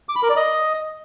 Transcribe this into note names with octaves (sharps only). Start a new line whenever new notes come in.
D6
B5
A#4
D5
D#5